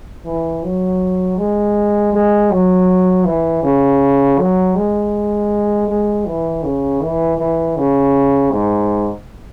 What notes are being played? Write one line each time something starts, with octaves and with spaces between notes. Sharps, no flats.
E3
F#3
G#3
G#3
F#3
E3
C#3
F#3
G#3
G#3
E3
C#3
E3
E3
C#3
G#2